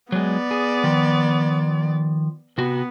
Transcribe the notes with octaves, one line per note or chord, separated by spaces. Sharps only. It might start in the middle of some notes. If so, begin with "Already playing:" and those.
F#3 G#3 B3 D5
G#4
D#3 F3
C3 B3 F#4